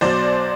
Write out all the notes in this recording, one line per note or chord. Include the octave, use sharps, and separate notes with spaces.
B1 B2 F#3 C5 D5